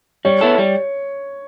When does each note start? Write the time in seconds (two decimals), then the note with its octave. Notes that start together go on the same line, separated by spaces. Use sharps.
0.25 G3 C#5
0.41 B3 E4 A4
0.58 G3